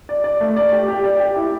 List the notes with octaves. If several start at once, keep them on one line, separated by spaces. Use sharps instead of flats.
D5
D5
A3
D5
G4
G4
D5
G4
E4